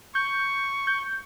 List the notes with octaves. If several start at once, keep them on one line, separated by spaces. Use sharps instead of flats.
C#6 G6
G6